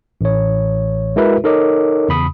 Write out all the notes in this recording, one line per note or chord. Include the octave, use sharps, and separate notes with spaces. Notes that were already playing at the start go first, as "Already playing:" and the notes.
A1 C#5
G#3 E4 F#4 A#4 B4 E5
D#4 A4 A#4 C#5 D#5 D6
E2 C#3 B5 D#6